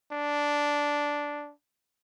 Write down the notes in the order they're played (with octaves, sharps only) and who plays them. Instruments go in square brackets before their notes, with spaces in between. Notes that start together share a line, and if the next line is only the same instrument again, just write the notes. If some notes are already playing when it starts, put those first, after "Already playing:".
[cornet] D4